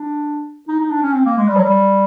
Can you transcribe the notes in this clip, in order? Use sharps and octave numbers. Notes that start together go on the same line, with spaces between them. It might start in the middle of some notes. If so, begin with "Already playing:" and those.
Already playing: D4
D#4
D#4
D4
C#4
C4
A#3
G#3
G3
F#3
G3